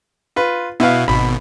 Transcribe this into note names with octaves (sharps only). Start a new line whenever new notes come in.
F4 B4
B2 E4 B4 F5
G#1 B2 B5